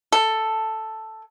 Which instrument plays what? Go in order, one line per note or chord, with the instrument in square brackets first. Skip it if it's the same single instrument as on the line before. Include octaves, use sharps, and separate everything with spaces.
[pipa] A4